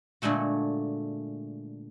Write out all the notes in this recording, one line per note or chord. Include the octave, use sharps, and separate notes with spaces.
A#2 D3 G#3 A3 F#4